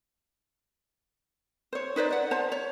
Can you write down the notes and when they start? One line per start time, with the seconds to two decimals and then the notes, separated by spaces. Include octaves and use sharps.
1.73 C5 C#5
1.96 D#4 B4 C5 D5
2.11 D5 F#5
2.31 C5 A5
2.52 C#5